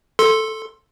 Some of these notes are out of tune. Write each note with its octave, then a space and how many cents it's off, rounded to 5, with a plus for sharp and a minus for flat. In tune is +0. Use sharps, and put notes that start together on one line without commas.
A4 +0 C6 +10